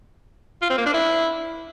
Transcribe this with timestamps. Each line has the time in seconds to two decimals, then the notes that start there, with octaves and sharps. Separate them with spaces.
0.62 F4
0.70 C4
0.78 A#3
0.86 D4
0.94 E4